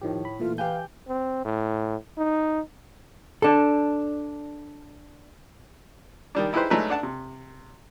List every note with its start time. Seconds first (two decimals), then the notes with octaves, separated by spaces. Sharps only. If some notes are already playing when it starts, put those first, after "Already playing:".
0.02 A2 D#3 F3 G4
0.25 B5
0.40 A#2 E3 A3 F4
0.58 E3 G4 B4 F5 G#5 G6
1.08 C4
1.45 A2
2.18 D#4
3.42 D4 A4
6.35 D#3 G3 D4
6.53 D#4 E4 G4 G#4 B4 C5
6.70 F#3 G#3 A3 D4 D#4 B4
6.90 D4 F#5 A5
7.03 C3